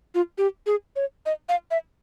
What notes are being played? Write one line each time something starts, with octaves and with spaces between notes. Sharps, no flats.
F4
G4
G#4
C#5
D#5
F5
E5